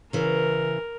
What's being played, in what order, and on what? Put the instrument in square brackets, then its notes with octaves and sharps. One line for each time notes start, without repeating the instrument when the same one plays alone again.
[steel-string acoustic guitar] C#3 E3 [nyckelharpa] A#4